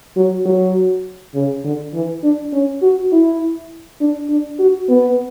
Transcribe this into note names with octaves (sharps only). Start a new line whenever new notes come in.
F#3
F#3
C#3
D3
E3
D4
C#4
F#4
E4
D4
D4
F#4
B3